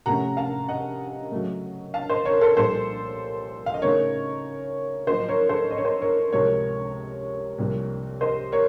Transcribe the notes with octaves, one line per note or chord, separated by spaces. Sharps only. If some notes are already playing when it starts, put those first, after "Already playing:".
C3 F3 A3 C#4 F#5 A#5
F5 A5
D#5 F#5
F#2 C#3 F#3 A3
F5 A5
C5 D#5
A#4 C#5
A4 C5
C2 A#2 F3 A#3 F4 A4 C5
F5
D#5
C#3 A3 D#4 A#4 C#5
F#2 F3 A#3 F4 C5 D#5
D#5
A#4 C#5
A4 C5
D#5
C#5
C5 D#5
A#4 C#5
C#2 C3 F3 A#4 C#5
C2 C3 F3 A#3
C5 D#5
A#4 C#5